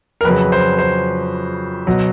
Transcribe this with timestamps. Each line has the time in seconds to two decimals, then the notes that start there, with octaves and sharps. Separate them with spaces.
0.21 A#4
0.24 F2 C#3 F#3 B4
0.52 C5
0.78 C5
1.87 B2 F#3